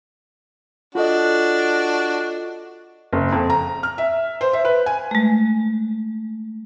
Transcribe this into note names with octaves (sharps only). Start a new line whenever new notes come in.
D4 F4 F#4 A4 D#5
F#1
F2
A#5
F6
E5
C5
E5
B4
G#5
G#3 A3